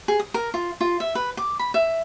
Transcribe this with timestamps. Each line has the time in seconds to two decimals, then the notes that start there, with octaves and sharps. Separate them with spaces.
0.08 G#4
0.20 D#6
0.34 A#4
0.54 F4
0.81 F4
1.00 E5
1.15 B4
1.37 D6
1.59 B5
1.74 E5